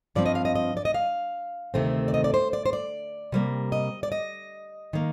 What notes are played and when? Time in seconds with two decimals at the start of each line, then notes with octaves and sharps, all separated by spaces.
0.15 G2 F3 C4 D5
0.26 D#5
0.35 F5
0.45 D#5
0.55 D#5
0.77 D5
0.85 D#5
0.94 F5
1.74 D2 C3 D#3 A3 C4
2.08 D5
2.14 D#5
2.24 D5
2.34 C5
2.53 D5
2.66 C5
2.73 D5
3.32 C3 G3 A#3
3.72 D#5
4.03 D5
4.12 D#5
4.93 D#3 A#3